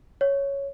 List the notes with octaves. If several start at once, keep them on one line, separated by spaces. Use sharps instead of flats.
C#5